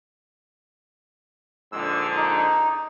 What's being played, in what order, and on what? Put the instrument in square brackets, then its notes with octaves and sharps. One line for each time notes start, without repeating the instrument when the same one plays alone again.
[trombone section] A#1 G#2 D3 [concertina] E6
[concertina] D#4